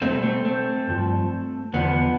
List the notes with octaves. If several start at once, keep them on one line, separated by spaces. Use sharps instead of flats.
B2 G3 A3 C4
A3 C4
A3 C4
G2 F3
E2 D3 F3 B3